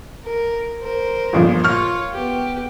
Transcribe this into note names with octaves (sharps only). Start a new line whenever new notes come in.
A#4
A#4 C5
G1 A#2 F3
F4 C#5 C#6 F6
B3 G4